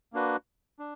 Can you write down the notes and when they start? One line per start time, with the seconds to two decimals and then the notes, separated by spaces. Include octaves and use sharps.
0.13 A#3 D4 F#4 B4
0.79 D4